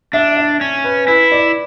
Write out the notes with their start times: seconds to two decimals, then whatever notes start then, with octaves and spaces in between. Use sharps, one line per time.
0.13 D4 E5
0.37 E5
0.61 C#4
0.84 B4
1.08 E4 B4
1.32 D5